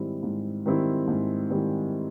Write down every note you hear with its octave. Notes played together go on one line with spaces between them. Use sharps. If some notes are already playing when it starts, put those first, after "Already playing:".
Already playing: G#2 D#3 G3 C4 E4
G#2
D#3 G3 C4 E4
G#2
D#3 G3 C4 E4